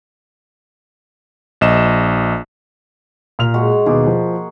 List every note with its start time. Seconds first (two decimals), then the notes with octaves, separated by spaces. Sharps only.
1.61 A#1 D#5 E7
3.39 A#2 F6 F7
3.54 G#3 F#4
3.86 D#2 B2 A#3 G#4 D6
4.07 F3